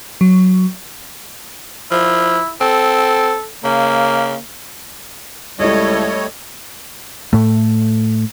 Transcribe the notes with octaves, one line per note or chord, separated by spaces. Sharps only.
F#3
F3 E4
C4 A4
C#3 A#3
C#2 G3 A3 E4 A4 C#5 D#5
A2 A3